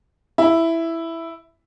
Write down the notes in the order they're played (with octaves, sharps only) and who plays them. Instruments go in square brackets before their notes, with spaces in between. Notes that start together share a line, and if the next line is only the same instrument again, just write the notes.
[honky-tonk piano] E4